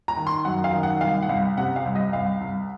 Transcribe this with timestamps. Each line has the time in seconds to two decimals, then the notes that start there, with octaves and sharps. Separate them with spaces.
0.08 A#5
0.17 D#3
0.27 C6
0.45 F#2 F#5
0.64 F5
0.73 D#3
0.83 F#5
1.01 C2 F5
1.22 F#5
1.29 C2 F5
1.58 C3 F#5
1.76 F5
1.86 C2
1.95 D#5
2.13 C2 F5
2.41 C2